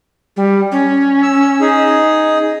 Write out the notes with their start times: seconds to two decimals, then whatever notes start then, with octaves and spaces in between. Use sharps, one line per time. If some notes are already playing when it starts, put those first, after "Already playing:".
0.37 G3
0.72 C#4
1.22 E6
1.61 D#4 G#4